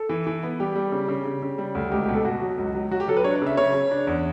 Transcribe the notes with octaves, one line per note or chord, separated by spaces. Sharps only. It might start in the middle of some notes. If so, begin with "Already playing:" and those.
Already playing: A4
E3
E3
B3
G3 G4
G3
C#3
C#3
C#3
C#3
G3
D2
C#2 G4
G4
B2
A4
B2 F#4
F#3
C#2
F#3
F#3 F#4
G4
F#3 A4
B4
D4 C#5
D5
C#3 E5
C#3 C#5
C#3
D4
E2